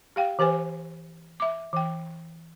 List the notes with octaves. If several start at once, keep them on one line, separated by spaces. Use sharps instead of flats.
G4 F5 G5
E3 G4 B4 C5 G#5
E5 D6
E3 G5